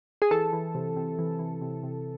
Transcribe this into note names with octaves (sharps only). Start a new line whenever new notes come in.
G#4
E3 A4
E3
C3
C3
E3
E3
C3
C3